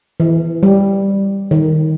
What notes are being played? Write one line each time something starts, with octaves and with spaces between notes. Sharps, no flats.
E3
G3
D#3